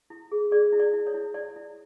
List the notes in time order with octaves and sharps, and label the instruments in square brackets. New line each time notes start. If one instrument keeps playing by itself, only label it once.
[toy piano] E4
G#4
G#4 D5
E4
D5
E4
C#5
E4
E4 D5
E4